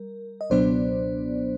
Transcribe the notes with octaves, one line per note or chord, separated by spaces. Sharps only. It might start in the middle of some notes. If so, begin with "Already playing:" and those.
Already playing: G3 A#4
D#5
C#2 B2 F#3 B3 D4 C5 D5